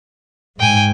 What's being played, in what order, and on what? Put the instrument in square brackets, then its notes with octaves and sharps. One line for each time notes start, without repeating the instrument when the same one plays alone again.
[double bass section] G#2 [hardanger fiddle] G5 G#5